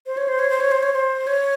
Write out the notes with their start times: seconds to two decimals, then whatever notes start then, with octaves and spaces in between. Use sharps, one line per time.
0.06 C5
0.17 C#5
0.28 C5
0.39 C#5
0.50 C5
0.60 C#5
0.71 C5
0.83 C#5
0.93 C5
1.27 C#5